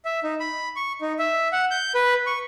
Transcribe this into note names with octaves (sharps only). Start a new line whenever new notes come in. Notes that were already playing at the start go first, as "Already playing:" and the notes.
E5
D#4
B5
C#6
D#4
E5
F#5
G6
B4
C#6